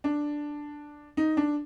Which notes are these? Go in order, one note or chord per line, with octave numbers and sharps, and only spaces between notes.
D4
D#4
D4